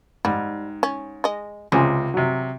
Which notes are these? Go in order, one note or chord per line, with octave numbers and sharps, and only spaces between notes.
G#2 G3
C#4
G#3 D#5
C#2 C3 C#4 G#4 C5
C3 F#3